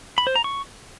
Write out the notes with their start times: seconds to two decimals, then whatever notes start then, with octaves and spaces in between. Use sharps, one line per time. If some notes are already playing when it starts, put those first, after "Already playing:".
0.18 B5
0.27 C5
0.35 A#5
0.44 C#6